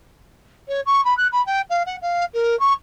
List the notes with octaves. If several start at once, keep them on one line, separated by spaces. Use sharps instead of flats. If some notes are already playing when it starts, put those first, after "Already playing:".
C#5
C#6
B5
F#6
B5
G5
F5
F#5
F5
A#4
C#6